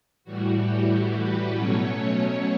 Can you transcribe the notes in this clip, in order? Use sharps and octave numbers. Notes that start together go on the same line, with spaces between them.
A2 E3 G3 F#4
G4
B4
B2 F#3 A3 C#4 C#5